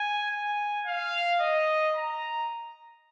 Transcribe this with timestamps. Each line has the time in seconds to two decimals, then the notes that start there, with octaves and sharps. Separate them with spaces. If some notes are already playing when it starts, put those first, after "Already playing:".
Already playing: G#5
0.31 G#5
0.86 F5
1.41 D#5
1.96 A#5